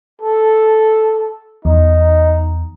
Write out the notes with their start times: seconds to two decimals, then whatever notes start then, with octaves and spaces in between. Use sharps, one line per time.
0.22 A4
1.65 E2 D#4